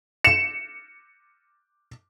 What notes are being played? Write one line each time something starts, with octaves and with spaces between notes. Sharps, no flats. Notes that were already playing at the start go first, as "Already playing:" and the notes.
C#7 E7